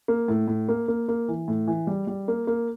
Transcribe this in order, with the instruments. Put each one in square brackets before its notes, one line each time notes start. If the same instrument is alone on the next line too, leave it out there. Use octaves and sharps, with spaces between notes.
[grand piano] A#3
A2
A2
A#3
A#3
A#3
E3
A2
E3
G3
G3
A#3
A#3